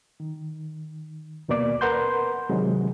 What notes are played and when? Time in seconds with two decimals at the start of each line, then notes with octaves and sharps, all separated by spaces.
0.20 D#3
1.48 D#2 B2 A#3 D5 D6
1.81 A#4 B4 F#5 C6 G6
2.50 C3 D#3 F#3 G#3